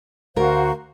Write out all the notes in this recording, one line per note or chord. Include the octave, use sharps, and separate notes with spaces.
D2 F#4 A#4 C5 F5